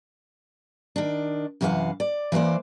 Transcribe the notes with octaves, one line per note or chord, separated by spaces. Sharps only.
D#3 D4
F#2 C3 E3 A#4 F5 F#5
D5
E3 A#3 B4 C5 D5